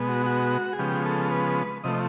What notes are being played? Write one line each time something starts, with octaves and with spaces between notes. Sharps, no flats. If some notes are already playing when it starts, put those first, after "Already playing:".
Already playing: B2 G#3 B3
F#4
F#4
G#4
C#3 F3 G#3 B3 G4
A4
B4
C3 F3 A3 D#5